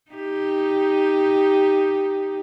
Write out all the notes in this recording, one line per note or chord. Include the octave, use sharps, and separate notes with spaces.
D#4 G4